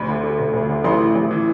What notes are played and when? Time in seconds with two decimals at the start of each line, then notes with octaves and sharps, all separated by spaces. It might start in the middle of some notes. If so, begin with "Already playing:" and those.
Already playing: D2 B5
0.08 D3
0.23 D3
0.39 D2
0.53 D2
0.69 D3
0.84 A1 C6
1.00 A2
1.15 A1
1.31 E3